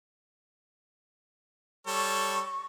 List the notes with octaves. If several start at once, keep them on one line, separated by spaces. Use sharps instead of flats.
G3 A4 C#5 C#6